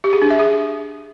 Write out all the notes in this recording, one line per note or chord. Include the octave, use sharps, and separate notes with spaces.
G4
G#4
D4
E5
G#4